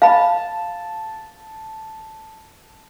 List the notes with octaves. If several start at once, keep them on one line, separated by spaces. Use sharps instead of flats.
F5 A5 B5